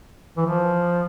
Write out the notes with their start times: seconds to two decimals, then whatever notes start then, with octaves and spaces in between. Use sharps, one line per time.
0.37 E3
0.46 F3